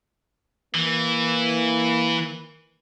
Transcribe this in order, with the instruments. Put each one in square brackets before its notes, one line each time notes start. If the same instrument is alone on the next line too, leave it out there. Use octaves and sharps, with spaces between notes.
[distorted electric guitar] E3 [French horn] A#3